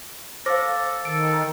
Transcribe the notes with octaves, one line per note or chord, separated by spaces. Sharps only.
A4 C5 F5 D6 A#6
D#3 A4 D7